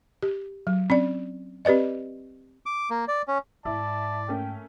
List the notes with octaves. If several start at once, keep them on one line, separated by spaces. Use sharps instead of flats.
G4
F#3
C4 C#4 D5
C4 G4 B4 D5 D#5
D6
A#3
D5
C#4
G#2 E4 D5 E5 A5
A3 A#3 C#4 G5